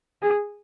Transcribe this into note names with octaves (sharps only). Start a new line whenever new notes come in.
G#4